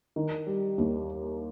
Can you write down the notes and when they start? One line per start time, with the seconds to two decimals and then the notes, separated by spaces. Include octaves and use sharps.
0.16 D#3
0.47 G3
0.78 D#2